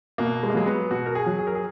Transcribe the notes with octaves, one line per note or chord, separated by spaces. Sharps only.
B2 A#3
G#3
A#3
F#3 G#3
B3
B2 F#4
A#4
G#4
F#3
G#4
A#4
G#4